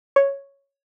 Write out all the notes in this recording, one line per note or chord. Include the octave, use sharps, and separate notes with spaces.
C#5